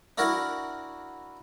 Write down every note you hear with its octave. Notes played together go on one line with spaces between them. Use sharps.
D4 E4 F#4 A#4